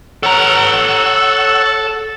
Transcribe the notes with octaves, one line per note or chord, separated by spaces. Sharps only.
A4 C#5 F#5 A#5 E6